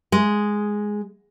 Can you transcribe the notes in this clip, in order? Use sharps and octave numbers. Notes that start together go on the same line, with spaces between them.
G#3